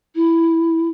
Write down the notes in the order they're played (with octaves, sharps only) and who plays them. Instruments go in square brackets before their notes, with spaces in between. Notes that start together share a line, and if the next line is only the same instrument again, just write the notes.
[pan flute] E4